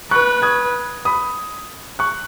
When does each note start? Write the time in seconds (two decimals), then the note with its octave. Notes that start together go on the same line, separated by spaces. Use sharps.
0.11 B4 C#6 F#6
0.42 D#6 G#6
1.05 B5 D#6
1.99 C#6 F#6